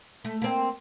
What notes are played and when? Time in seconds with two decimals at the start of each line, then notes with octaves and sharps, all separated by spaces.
0.25 A3
0.42 A#3 C4